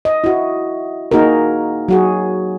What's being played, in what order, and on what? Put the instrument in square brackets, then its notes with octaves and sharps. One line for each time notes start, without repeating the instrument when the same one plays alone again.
[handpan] D#5
E4 F#4
A#3 D#4 F#4 G#4 A#4
F#3 F#4 G#4